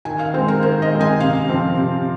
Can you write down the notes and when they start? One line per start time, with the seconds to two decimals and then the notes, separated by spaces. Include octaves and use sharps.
0.05 D#3 G#5
0.19 F5
0.34 G#3 C4 C5
0.48 A#4
0.63 D#3 C5
0.82 D#5
0.91 G#3 C4
1.01 G#5
1.20 C3 F5
1.49 F3 C4
1.78 C3